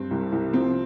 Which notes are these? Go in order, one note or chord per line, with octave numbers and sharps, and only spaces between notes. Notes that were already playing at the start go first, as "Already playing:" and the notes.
Already playing: G2 C4
C2
C2
F3 C4